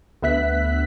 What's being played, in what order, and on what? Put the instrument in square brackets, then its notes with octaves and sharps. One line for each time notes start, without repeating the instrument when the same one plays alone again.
[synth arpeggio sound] D2 B3 E5 F#6 B6